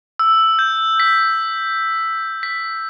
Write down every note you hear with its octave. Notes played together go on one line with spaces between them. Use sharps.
E6
G6
B6
B6